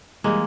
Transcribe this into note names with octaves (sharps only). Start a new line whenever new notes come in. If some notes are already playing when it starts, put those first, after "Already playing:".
E3 G3 G#3 A#3